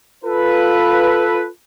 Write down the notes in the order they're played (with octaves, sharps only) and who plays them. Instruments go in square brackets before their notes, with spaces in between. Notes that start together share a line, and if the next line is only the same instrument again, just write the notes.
[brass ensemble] F4 A4 B4